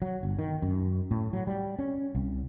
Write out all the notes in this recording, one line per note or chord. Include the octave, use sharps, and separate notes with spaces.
F#3
G1
D#3
F#2
A2
F#3
G3
C#4
C2